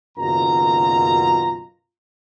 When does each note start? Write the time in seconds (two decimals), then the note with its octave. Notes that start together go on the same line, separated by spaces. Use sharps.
0.18 F#1 F#2 B2 D#3 F4 A#5